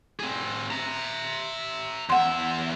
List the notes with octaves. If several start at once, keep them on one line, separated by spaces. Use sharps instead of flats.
C4 G#4
E5 A#5
E2 E5 F#5 C6